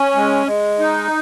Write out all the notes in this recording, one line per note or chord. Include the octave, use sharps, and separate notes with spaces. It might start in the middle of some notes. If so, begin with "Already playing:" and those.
Already playing: C#4
G#3
G#3
D#4